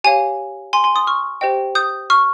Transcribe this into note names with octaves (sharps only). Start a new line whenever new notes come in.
G4 C#5 F5 G#5
G#5 C6
G#5 C6
C6 D#6
C#6 F6
G4 C5 D#5 G5
D#6 G6
C#6 F6